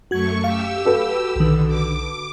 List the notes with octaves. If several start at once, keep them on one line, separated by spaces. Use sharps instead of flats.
F#2 A3 F#4 C#6 G#6
G4 F5 E6
F#4 A4 B4
B1 D3 D#3
D6